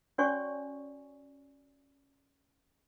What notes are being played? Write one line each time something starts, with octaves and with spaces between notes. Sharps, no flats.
C#4 F#4 C#5 D5 G#5 C#6